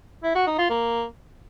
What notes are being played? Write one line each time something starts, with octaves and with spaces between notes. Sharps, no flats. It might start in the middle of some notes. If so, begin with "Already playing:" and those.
E4
F#4
D#4
F4
A#3